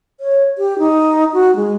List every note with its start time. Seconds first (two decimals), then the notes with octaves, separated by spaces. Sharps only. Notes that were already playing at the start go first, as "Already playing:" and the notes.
0.20 C#5
0.58 G4
0.79 D#4
1.33 F#4
1.56 G#3